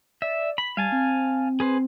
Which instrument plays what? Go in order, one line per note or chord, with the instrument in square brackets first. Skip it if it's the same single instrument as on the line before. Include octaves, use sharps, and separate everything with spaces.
[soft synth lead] D5 [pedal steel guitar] E5
[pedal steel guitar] B5 [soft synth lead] B6
[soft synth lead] G3 [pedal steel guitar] F5 G#5 A5
[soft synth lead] C4
[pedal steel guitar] G#4 B4 C5